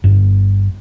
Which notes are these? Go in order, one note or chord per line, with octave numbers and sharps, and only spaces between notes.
G1 G2